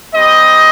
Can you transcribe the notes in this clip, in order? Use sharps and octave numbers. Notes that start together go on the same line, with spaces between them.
G3 C4 G4 D#5